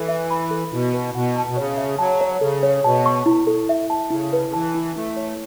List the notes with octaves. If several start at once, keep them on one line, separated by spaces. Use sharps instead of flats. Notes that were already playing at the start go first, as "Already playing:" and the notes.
Already playing: E3 A4
E5
B5
A4
B2 E4
B4
B2 F#5
A5
B2
C#3 C#5
E5
F#3 A5
C#5
C#3 A4
C#5
B2 A5
C#6
E4
A4
E5
A5
C#3 E4
B4
C#3
E3 A5
E4
A3 E4
C#5